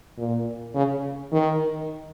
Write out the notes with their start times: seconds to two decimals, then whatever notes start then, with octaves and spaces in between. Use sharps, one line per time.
0.18 A#2
0.75 C#3
1.32 D#3